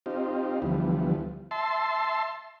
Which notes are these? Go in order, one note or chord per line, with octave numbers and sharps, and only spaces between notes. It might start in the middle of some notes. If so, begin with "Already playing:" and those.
C4 D#4 F4 G4
D2 E3 F3 G3 B3
E5 A5 C6